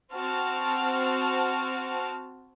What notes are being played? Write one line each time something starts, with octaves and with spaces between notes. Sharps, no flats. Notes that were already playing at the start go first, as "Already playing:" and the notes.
C4 F#4 A5 F6